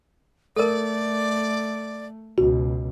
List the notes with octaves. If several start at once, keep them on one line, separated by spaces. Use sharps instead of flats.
A3 A4 A#4 D5
C#2 B2 F#4